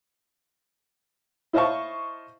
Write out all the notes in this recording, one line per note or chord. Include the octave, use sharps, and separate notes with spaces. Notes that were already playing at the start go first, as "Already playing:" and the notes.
E4 C5 D#5 F5 A5 C#6